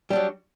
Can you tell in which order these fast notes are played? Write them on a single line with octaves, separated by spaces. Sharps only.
G3 D4 F#3